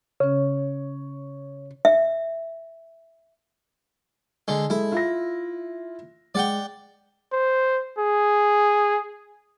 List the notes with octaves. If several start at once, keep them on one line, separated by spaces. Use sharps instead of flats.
C#3 C#4 C#5
E5
D3 G#3
G#3 E4 A4
F4 E5 A#6
G#3 D5 F#5 G5
C5
G#4